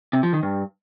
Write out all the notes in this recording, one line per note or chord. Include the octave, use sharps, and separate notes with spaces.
C3
F3
D#3
G2